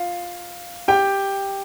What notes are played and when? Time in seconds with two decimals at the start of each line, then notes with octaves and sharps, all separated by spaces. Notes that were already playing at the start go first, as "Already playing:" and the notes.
Already playing: F4 F5
0.88 G4 G5